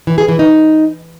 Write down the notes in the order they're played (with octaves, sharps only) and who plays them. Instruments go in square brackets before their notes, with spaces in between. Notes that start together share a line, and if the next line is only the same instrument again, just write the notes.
[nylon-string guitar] E3
G#4
E3
D#4